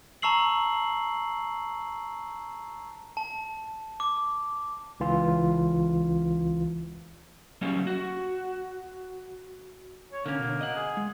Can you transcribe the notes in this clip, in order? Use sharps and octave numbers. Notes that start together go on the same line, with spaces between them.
A5 A#5 C#6 E6 C7 F#7
A5
D6
C#2 E3 F4
F#3 G3 A#3 C#4
F#4
C#5
D3 A#3 C#4
B2 D3
D#5 F#5
G#4
G#3